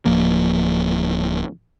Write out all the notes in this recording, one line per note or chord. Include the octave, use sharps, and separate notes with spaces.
D1 F3 A#3